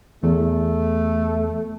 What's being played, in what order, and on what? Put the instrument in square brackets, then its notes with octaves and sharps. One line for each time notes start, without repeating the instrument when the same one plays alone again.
[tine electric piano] E2 [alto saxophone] A3